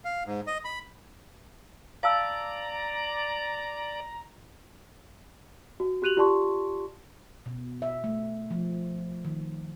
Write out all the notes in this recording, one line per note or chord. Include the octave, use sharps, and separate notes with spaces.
F5
G#2
D#5
B5
D5 F5 A5 A#5 E6
F#4
F#4 G4 F#6 D#7 F7 F#7
F4 G4 D5 A5 C6 C#6
B2
E5
A3
F3
D#3